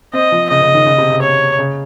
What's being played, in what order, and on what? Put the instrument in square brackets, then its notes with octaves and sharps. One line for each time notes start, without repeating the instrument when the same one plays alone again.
[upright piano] C4 [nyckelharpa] D#5
[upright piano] F3
[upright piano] C#3 [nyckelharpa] D#5
[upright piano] C#3
D#3
C#3
C3
C#3
[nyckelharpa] C#5
[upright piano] C#3